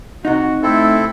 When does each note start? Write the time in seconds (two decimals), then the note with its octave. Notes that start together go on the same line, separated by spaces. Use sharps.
0.25 C3 D#4 F#4
0.63 A3 C4 E4 A4